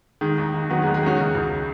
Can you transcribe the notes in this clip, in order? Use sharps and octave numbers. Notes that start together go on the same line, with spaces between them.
D#3 G#3
D#2
D#3
D#3 F#3 B3
G#3
D#2
G#3
D#3 C#4 F#4
C#3
C#2